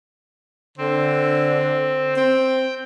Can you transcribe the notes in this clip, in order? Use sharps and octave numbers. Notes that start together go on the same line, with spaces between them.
D3 C4
C4 G5